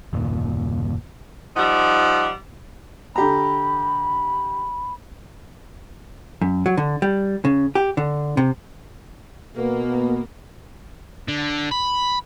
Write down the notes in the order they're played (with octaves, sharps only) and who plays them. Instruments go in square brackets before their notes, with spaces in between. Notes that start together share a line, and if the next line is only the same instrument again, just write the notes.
[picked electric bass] F#1 D#2 A#2
[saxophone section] F3 G3 D#4 F#5
[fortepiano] D3 G4 A#5 [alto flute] B5
[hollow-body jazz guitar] F#2
F#3
D3
G3
C#3
G4
D3
C3
[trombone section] B2 B3 [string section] A#3
[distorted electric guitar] D3
B5